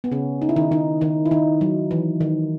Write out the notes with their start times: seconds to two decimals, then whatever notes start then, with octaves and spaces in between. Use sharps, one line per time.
0.04 B3
0.12 C#3 C#4
0.42 D#4
0.49 E4
0.56 D#3 D#4
0.71 D#3 D#4
1.01 D#3 D#4
1.25 E4
1.31 D#3 D#4
1.61 F#3
1.91 E3
2.21 D#3